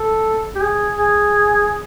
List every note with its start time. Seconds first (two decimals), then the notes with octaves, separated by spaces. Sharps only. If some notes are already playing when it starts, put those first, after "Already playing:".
Already playing: A4
0.56 G4
0.61 G#4
0.97 G#4